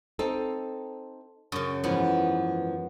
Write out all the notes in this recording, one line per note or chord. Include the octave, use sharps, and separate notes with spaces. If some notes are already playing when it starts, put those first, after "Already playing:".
C4 D#4 A4
F#2 C#3
G#2 E3 F3 B3